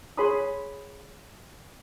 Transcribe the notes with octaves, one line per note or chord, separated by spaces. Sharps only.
G#4 C#5 G#5 B5 C6 D#6